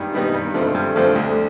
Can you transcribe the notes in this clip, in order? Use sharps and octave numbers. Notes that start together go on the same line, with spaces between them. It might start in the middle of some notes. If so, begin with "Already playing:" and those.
Already playing: G2 D#3 G3 B3 D#4
D#3 G3 B3 D#4
G2
D3 F3 A3 C4
G2
D3 F3 A3 C4
D2